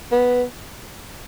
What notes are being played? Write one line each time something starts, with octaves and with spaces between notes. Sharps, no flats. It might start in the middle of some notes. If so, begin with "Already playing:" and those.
B3